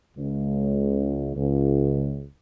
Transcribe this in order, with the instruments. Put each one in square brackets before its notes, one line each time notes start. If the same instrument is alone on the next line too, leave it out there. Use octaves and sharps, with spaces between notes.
[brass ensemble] C#2
C#2